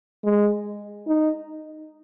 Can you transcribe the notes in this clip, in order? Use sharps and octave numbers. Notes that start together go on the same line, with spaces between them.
G#3
D#4